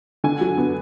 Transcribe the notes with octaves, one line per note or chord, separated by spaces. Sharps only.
D3 G#5
F#3
B3